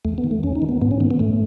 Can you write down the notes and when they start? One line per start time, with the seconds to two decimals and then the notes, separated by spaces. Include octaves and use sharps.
0.05 E2 A3
0.18 B3
0.24 D#3
0.31 A3
0.43 E2 C#4
0.55 D#4
0.62 D#3
0.69 B3
0.81 G#2 B3
0.91 C#4
1.00 D#3 B3
1.11 B3
1.19 G#2 A3